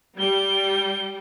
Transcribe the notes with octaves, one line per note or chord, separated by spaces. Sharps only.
G3 G7